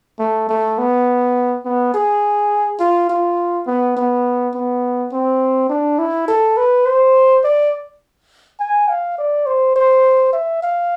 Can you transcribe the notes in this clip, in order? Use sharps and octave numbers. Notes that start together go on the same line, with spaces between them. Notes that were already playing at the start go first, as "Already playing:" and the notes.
A3
A3
B3
B3
G#4
F4
F4
B3
B3
B3
C4
D4
E4
A4
B4
C5
D5
G#5
F5
D5
C5
C5
E5
F5